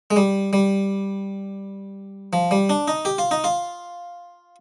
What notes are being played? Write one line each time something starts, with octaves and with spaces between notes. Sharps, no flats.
G#3
G3
G3
F3
G3
D4
D#4
G4
F4
D#4
F4